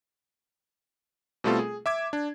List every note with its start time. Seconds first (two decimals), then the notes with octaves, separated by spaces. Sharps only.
1.44 B2 G3 A3 C4 F4 A4
1.59 G#4
1.86 E5 D6 G#6
2.13 D4